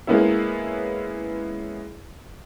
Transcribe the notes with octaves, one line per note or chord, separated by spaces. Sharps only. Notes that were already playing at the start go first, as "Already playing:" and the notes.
G#3 A#3 B3 C#4 E4